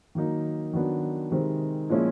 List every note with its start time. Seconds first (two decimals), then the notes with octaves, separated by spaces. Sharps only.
0.15 D#3 F#3 A#3 D#4
0.73 D#3 F#3 B3 D4
1.32 C3 D#3 G#3 C4
1.89 A#2 F3 G#3 C#4 E4